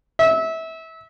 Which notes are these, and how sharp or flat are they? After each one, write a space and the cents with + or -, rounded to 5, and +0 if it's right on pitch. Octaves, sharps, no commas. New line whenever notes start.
E5 -25